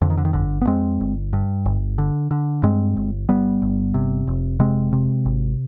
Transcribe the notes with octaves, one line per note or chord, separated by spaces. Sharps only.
F2 D3
D#3
D3
D#3
G1 D3
B3
F2 G#3 C4
G1
G2
G1
D3
D3
G2 G#3 C4
G1
G1 G3 B3
G1
C3
F1
C3 G#3 C4
C3
G#1